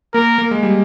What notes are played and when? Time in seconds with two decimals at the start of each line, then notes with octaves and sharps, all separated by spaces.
0.14 A#3 A#4
0.38 A#3
0.51 G#3
0.63 G3